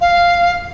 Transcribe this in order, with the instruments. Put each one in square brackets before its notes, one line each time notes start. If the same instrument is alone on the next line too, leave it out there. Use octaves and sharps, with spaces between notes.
[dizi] F5